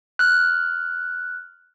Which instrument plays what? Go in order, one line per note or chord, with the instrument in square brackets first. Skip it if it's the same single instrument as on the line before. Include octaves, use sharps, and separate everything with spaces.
[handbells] F6 F#6